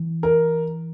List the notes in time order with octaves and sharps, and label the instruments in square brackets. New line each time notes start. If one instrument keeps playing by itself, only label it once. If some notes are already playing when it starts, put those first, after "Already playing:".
Already playing: [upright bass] E3
[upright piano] A#4